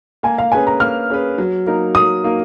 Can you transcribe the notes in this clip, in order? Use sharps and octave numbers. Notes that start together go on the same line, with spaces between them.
A#3 G#5
F5
C#4 G#4 B4 G#5
A#5
A#3 F6
C#4 G#4 B4
F#3
A#3 D#4 A#4
F#3 D#6
A#3 D#4 A#4